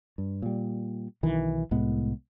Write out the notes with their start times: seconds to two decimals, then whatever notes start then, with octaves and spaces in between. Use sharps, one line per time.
0.18 G2
0.42 A#2 G3
1.23 B1 D#3 E3
1.71 C2 A2 G#3 B3